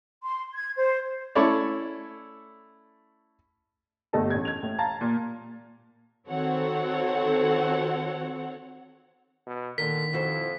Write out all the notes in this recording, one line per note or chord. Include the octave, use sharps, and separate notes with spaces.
C6
G#6
C5
A3 C#4 E4 A4 C#5 D5
G1 G2 A3 A4 D#5 A5
A1 G#6
G#6 F7
A2
F5 A5 A#5 A6
A#2
D#3 C4 F#4 A4 C#5 F#5
B2
A#2 D3 D#3 A#4 B6
F2 E3 F#4 C5